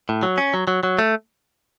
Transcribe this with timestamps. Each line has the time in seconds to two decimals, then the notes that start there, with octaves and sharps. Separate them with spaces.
0.09 A2
0.23 F#3
0.38 C#4
0.54 F#3
0.68 F#3
0.83 F#3
0.99 A3